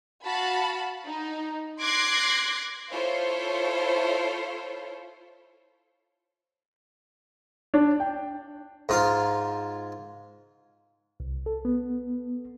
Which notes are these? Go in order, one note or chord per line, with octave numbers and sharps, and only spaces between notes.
F#4 F5 A5 B5
D#4
C6 D6 F#6 G#6 A#6 C7
E4 F4 A4 C5 C#5 F5
D4
G5
G#2 F4 F5
C2
A4
B3